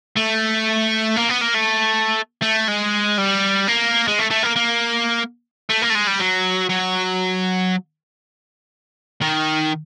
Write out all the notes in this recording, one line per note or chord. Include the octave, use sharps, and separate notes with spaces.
A3
A#3
B3
A#3
A3
A3
G#3
G3
A#3
G#3
A3
A3
A#3
A#3
A3
A#3
A3
G#3
G3
F#3
F#3
D#3